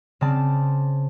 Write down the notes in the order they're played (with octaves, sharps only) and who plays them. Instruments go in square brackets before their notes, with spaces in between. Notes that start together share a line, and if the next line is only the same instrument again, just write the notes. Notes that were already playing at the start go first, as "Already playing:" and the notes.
[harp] C#3 C4 D5 A5